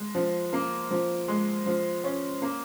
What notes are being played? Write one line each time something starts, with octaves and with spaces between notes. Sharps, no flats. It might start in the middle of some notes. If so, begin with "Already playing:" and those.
Already playing: G#3
F3
A#3
F3
G#3
F3
C#4
A#3